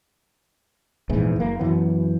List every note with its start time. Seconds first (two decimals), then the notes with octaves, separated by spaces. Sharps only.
1.09 A#1 E2 G#2 E3
1.36 F#1 A#3
1.59 F#2 E3 F#3 B3